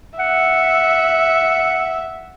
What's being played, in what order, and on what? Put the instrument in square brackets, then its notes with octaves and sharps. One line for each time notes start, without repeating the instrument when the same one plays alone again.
[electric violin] E5 [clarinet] F#5